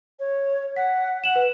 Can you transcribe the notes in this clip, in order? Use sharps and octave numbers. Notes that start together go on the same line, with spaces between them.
C#5
F#5 B6
F#5 E7 F#7
B4